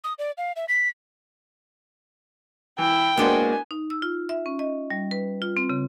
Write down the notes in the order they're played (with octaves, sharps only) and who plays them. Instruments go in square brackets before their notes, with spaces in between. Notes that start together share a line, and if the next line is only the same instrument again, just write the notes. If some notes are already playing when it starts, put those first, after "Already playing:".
[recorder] D#6
D5
F5
E5
B6
[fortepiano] E3 [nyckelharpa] E4 [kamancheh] G5
[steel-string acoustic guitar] G#3 A#3 F#4 [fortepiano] B3 D4 C5 [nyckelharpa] G#5
[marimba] D#4
E6
F4
E5
C#4
D#5
G3
B4
F4
C4
C#3